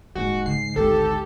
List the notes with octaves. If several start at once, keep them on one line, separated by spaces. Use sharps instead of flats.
D#1 G#2 D#4 F#4
C#3 G#3 C7
G#1 D2 G4 A4